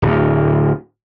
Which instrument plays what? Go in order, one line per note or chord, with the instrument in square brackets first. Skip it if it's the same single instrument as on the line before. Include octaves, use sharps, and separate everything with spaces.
[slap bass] D1 D2